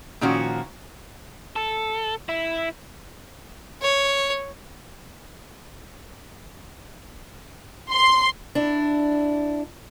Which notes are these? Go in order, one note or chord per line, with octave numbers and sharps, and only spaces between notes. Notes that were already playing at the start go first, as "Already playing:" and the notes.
A#2 D#3 F3 C#4 F#4
A4
E4
C#5
C6
D4 E4